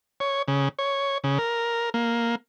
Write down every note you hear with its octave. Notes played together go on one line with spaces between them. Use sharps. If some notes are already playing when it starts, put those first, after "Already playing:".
C#5
C#3
C#5
C#3
A#4
A#3